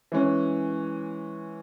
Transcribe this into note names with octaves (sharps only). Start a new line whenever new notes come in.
E3 G#3 C#4